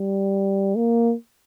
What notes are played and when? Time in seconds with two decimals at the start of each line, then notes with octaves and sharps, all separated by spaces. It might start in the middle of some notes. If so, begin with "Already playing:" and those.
Already playing: G3
0.76 A#3